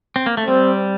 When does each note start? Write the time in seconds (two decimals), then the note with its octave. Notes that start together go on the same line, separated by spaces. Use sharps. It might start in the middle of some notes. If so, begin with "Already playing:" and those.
0.16 C4
0.26 A#3
0.37 A3
0.47 G3 C4